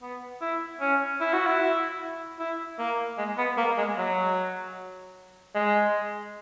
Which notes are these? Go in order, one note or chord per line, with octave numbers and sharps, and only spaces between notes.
B3
E4
C#4
E4
F#4
E4
E4
A#3
G#3
B3
A#3
G#3
F#3
G#3